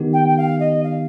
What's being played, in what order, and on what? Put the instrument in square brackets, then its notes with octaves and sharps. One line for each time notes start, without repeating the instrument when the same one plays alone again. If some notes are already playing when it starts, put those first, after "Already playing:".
Already playing: [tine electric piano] D#3 B3 D#4 G4
[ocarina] G5
G5
F5
D#5
F5